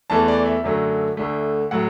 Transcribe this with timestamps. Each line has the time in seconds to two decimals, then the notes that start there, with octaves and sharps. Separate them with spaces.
0.10 E2 E3 A3 A5
0.28 D5
0.46 E5
0.64 F#2 D3 F#3 A3
1.17 D2 D3 A3
1.71 A2 F#3 F#5